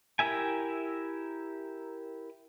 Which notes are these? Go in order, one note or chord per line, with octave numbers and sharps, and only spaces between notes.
E4 G4 A#4 E5 G#5